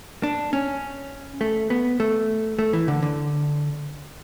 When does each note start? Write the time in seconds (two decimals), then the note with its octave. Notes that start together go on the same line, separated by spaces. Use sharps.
0.23 D4
0.53 C#4
1.41 A3
1.70 B3
2.00 A3
2.59 A3
2.73 E3
2.88 D3
3.03 D3